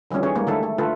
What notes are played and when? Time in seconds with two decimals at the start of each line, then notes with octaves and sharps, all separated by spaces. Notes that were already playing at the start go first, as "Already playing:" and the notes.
0.11 D3 E3 F3 G3 C#4
0.23 D#3 C#4 G#4 C#5
0.36 G3 G#3 A#3
0.47 D3 D#3 A3 E4 A4
0.63 A3
0.78 D3 A3 F4 A4 B4